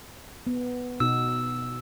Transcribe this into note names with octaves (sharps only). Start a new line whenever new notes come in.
B3
B2 D#4 F#4 E6